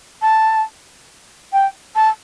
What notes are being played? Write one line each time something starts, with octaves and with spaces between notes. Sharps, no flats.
A5
G5
A5